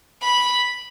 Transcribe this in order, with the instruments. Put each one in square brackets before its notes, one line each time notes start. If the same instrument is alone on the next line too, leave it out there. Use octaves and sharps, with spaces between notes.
[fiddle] B5